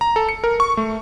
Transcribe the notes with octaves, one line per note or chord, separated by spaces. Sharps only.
A#5
A4
C#7
A#4
C#6
A3